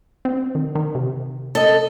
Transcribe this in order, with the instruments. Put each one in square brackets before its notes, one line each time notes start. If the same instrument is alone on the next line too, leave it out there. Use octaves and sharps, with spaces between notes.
[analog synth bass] C4
D#3
D#3
C3
[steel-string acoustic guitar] A4 D#5